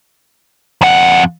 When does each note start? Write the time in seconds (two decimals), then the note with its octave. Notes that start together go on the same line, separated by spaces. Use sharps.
0.81 F2 F#5